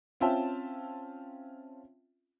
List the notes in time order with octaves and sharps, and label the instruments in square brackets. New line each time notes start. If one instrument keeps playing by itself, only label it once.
[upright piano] C4 C#4 F4 E5 G5 A5